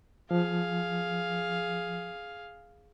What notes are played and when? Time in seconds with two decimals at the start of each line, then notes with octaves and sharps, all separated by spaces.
0.31 F3 G#4 F5